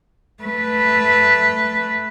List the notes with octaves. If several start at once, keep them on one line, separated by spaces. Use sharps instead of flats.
A3 B4